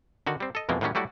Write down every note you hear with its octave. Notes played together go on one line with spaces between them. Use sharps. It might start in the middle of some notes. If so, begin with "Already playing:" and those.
D3 D#3 F#4
G3 C4
A4 D#5
F2 B2 E3 F3 G#3 A#3
A2 D#3 F#3 G3 C#4
F#3 G3 A3 E4 F#4